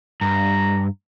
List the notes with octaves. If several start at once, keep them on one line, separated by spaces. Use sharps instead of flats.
G2 A#5